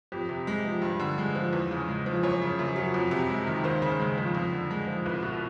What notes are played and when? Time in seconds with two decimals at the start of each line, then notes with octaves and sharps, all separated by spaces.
0.12 F2 G4
0.29 C3
0.47 G#3
0.65 F3
0.82 G2
1.00 D3
1.18 G#3
1.35 F3
1.53 E2
1.71 C#3
1.88 G#3
2.06 F3
2.23 F#2 C#5
2.41 C#3
2.59 F#2
2.76 F#3
2.94 F2
3.11 C3
3.29 G#3
3.47 D#3
3.64 D#2 C5
3.82 C#3
3.99 G#3
4.18 F3
4.35 F2
4.52 D3
4.71 G#3
4.87 F3
5.05 C2 B4
5.23 B2